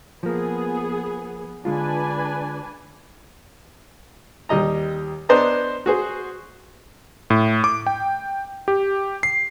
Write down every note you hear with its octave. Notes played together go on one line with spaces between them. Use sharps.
F3 A#3 B3 G#4
D3 G#3 D4 F4 B4 G#5
D#2 G3 D#5 A#5
B3 D4 C5 D5 D#5 A#5
F#4 G#4 C5
A2
D6
G5
G4
C7